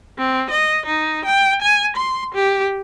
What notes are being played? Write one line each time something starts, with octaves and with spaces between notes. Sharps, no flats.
C4
D#5
D#4
G5
G#5
C6
G4